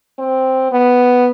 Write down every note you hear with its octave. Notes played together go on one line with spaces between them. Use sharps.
C4
B3